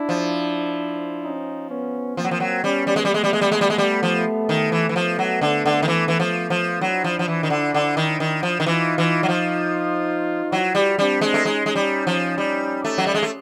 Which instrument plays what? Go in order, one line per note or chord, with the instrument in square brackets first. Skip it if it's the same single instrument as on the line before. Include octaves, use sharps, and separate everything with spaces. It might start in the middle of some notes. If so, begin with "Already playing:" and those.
Already playing: [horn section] D4 E4
[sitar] F3
[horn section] C#4 D#4
B3 C#4
[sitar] F3 [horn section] A#3 C4
[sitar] F#3
F3
F#3
[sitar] G3 [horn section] B3 C#4
[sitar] G3
G#3
G3
[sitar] G#3 [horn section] A3 B3
[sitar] G3
G#3
G3
G#3
G3
G#3
G3
F3
D#3
E3
E3
[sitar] F3 [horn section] A3 B3
[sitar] F#3
D3
D3
D#3
E3
E3
F3
F3
[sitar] F#3 [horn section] D4 E4
[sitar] F3
F3
E3
D#3
D3
D3
D#3
D#3
F3
D#3
[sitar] E3 [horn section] D#4 F4
[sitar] E3
F#3
F3
[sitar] F#3 [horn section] E4 F#4
[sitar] G3
[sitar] G3 [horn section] C4 D4
[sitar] G#3
A3
[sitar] G#3 [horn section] C#4 D#4
[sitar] G#3
G3
F3
G3
A3
F#3
G3
G#3
A3